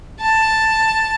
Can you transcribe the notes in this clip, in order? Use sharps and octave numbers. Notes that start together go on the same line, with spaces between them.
A5